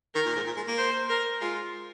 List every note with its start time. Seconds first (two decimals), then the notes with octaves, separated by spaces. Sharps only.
0.15 D#3 A#4
0.26 A#2
0.36 G#2
0.47 A#2
0.57 G#3
0.68 A#3
0.78 C5
1.09 A#4
1.41 G#3 F4